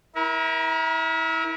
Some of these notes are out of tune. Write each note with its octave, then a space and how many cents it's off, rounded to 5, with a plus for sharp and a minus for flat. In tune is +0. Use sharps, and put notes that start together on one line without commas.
E4 -25 A#4 +30